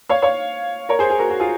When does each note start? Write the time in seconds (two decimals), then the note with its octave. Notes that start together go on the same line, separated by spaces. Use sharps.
0.09 C#5 F5
0.22 C#5 F5
0.89 A#4 C#5
0.99 G#4 C5
1.10 G#4
1.19 F#4 A#4
1.30 F#4
1.40 F4 G#4